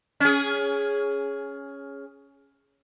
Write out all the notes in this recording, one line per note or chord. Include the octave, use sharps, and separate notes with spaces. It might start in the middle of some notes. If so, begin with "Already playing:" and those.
C#4 G#4